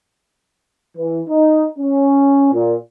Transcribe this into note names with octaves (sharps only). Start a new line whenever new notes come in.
E3
D#4
C#4
A#2